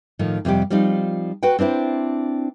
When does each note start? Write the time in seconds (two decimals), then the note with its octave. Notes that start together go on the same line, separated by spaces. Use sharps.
0.19 A2 D#3 F3
0.45 F2 C3 G3 G4
0.70 F3 G3 C4 D#4 F4
1.43 F#4 B4 F#5 G5
1.59 C4 D4 E4 C5